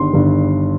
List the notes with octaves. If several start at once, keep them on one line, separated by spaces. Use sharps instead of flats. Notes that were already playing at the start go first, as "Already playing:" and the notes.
Already playing: G1 G2 D#3 C6
G1 G2 D#3